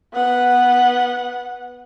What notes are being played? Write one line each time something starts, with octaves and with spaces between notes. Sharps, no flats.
B3 F#5